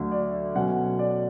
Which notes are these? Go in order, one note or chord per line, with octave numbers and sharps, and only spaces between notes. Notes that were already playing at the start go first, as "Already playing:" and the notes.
Already playing: D2 D3 F#3
D5
B2 F#3 C#4 F#5
D5